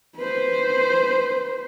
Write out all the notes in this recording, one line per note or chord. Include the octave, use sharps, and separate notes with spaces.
B4 C5